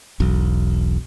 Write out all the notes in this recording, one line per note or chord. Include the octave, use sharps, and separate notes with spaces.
E1 B1